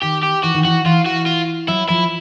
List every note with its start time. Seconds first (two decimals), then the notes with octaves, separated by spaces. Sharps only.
0.03 D#3 G4
0.23 G4
0.43 E3 F#4
0.55 D#3
0.65 E3 F#4
0.85 E3 F4
1.06 F#4
1.26 F4
1.68 F#3 E4
1.89 F3 E4